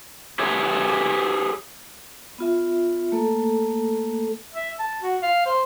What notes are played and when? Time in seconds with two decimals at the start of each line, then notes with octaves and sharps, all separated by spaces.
0.39 G4 G#4 B4 C#5 E5
2.38 B3 F4 E5
3.12 A3 A#3 A4
4.54 E5
4.79 A5
5.02 F#4
5.22 F5
5.46 C5